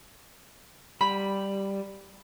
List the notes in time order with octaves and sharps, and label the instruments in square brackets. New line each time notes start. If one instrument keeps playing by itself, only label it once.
[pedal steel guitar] G3 [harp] B5